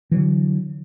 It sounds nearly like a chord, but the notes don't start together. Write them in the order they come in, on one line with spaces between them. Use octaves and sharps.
E3 F#3 D3